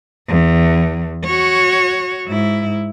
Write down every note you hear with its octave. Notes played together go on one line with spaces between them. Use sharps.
E2
F#4 C#5
G#2 E4